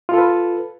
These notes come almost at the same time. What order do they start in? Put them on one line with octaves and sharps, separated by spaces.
F4 A4 B4